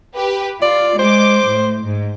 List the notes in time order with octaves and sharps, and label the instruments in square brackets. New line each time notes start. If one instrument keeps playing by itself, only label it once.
[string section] G4 B4
[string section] F4 [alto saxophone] D5
[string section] G#3 D6 [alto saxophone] C5
[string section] A2
G#2